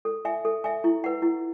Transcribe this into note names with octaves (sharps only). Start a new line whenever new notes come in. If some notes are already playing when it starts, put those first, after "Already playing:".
A4
E5 G#5
A4
E5 G#5
E4
B4 F#5
E4